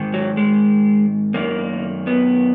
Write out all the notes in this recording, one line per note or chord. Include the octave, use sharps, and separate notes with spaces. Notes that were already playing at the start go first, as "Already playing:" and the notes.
Already playing: G#2 D#3
F#3
G#3
F#2 D#3 A#3
B3